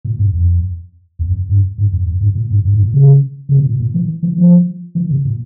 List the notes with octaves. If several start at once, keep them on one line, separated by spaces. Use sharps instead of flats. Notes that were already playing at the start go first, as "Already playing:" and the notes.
A#2
G2
F2
E2
F2
G2
G#2
F2
F2
G#2
A#2
G#2
G2
G#2
A#2
C#3
C#3
C3
A#2
A#2
E3
E3
F3
E3
C3
A#2